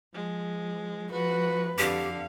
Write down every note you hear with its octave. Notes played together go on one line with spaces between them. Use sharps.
F3 G#3
F3 F#4 B4
F2 D3 G4 F5